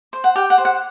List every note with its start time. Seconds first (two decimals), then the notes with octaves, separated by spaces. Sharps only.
0.13 C5
0.24 F#5
0.36 G4 G5
0.50 F#5
0.58 C5
0.65 F#5